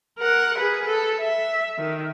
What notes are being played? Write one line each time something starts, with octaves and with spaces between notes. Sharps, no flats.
A#4 F#5
G#4 B4
A4
E5
D#3